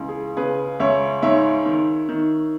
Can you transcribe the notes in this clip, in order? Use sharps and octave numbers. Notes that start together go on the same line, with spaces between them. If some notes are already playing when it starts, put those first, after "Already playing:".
Already playing: C#2 E3
G#4
C#3 G#4 B4
C#2 C#5 E5
G#2 C#5 E5
D#3
D#3